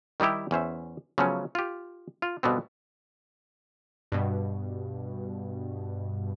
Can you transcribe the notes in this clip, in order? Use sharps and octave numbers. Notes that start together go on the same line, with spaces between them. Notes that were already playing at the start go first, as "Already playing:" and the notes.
D#3 G3 D#4 E4 G4
E2 C#4 C5 E5
C#3 F3 F#3 A3 B3 C#4
F4 G4
F4
G2 B2 D3 B3 C4
G2 B2